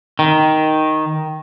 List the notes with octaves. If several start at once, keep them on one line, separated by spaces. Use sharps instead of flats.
D#3